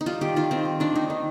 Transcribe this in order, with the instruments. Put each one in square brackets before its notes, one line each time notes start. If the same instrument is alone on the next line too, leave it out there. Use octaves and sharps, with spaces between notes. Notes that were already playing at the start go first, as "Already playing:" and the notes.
[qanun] D#4
G3 F4
D#3 G4
D#3 F4
D#3 C4
G3
D#3 D4
A#3 D#4
D#3